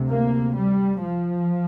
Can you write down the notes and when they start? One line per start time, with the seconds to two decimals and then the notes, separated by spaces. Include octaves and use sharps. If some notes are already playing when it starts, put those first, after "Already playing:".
Already playing: D2 C3
0.10 A#3
0.57 G3
1.04 F3